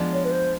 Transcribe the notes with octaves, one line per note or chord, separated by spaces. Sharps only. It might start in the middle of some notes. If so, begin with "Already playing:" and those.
Already playing: F3 G#3 B3 D4
C#5
B4
C5